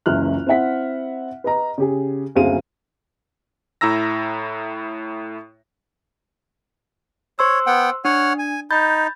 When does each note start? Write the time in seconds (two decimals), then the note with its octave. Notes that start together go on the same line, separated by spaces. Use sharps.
0.06 F#1 C#2 E3 E5 F6 F#6
0.47 C4 E4 E5 F#5 B6
1.44 B4 D#5 A#5
1.78 C#3 G4 G#4
2.35 F#1 D2 C4 G#4 F5 D#7
3.81 A2 E4 A#5 E6 A#6
7.39 C5 C#5 C6 E6
7.67 B3 F#5 G5
8.05 D4 C#5 F#5 F6
8.39 G#5
8.71 D#4 B5 G6 A6